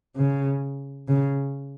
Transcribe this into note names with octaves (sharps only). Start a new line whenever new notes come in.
C#3
C#3